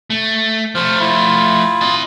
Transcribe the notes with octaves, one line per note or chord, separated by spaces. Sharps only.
A3
F3 A3 C5 F6
E4 F4
D#5 A5